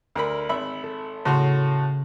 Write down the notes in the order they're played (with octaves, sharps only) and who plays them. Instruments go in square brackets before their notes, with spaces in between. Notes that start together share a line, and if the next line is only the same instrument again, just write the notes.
[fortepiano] D2 A#4 B5
G#1 E5 B5
[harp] A4
[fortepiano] A2 F#4 C6 [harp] C#3
[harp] F#6